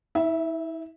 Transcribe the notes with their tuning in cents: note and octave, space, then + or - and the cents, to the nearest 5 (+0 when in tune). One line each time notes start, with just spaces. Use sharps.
E4 -35 E5 +0